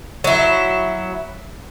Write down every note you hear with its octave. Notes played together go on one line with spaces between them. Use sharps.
F#3 E4